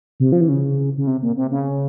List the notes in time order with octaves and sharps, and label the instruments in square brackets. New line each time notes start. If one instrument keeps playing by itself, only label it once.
[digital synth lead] C3
F3
E3
C#3
C#3
C3
A#2
C3
C#3